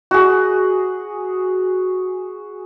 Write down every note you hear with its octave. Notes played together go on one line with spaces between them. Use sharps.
F#4 G#4